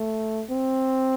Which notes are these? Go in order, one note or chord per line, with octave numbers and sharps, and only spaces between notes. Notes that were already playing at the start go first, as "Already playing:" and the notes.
Already playing: A3
C4